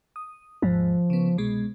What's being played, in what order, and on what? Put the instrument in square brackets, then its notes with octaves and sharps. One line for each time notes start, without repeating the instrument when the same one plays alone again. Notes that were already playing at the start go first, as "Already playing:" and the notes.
[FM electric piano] D#6
[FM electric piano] G#1 D#2 G#2 [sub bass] F3
[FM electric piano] C#3 B3
C2 B2 G#3